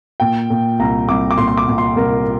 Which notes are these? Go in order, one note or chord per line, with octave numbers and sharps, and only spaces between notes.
A#2 G5
A#2
C2 A#5
C2 D6
D6
A#2 C6
C6
D6
A#2
C6
C2 A#4